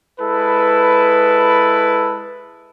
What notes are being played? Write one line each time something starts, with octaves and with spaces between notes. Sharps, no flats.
G#3 E4 A4 B4